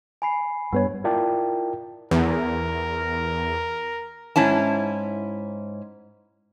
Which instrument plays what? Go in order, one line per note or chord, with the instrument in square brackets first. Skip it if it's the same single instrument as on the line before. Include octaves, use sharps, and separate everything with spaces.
[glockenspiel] G#5 B5 C7
[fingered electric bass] G2 [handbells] B3 B4 C#5
[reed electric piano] E4 F4 A#4 D5 G5 A5
[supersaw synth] E2 [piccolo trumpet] A#4
[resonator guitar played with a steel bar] G#2 C#4 E4 A5